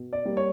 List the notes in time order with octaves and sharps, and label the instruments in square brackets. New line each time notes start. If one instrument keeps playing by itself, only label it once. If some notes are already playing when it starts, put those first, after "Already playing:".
Already playing: [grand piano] B2
D5
G3 A#3
C#5